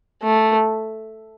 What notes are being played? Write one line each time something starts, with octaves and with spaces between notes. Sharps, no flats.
A3